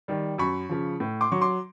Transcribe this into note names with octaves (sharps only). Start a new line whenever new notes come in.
D#3 G3
F#2 B5 C#6
C#3 F3
A2
C6 D6
F#3 C#6
C6 D6